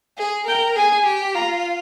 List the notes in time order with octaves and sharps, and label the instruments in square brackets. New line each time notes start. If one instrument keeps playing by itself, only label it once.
[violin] G#4
[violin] A#4 [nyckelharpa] G5
[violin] G#4 [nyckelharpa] G#5
[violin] G4
[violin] F4 [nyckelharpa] A#5